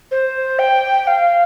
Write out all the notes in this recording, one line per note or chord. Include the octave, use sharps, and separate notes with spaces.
C5
G5
F5